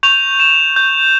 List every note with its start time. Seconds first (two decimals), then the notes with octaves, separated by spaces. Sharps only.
0.03 C#6 G6 F7
0.40 E7
0.76 G6